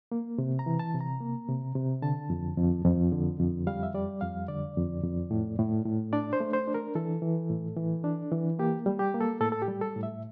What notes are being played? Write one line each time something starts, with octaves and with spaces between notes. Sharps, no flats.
A#3
C3
A#5
E3
A5
C3
A#5
A#3
C3
C3
D3 A5
F2
F2
F2
D3
F2
G3 F5
E5
G3 D5
F2 F5
D3 D5
F2
F2
A2
A2
A2
D4 D5
C5
A3
C5
D4
A#4
E3 A4
E3
A2
E3
D4
E3
A#3 G4
G3
G4
A#3
A4
A2 A4
A4
G4
G3
A4
A2
E5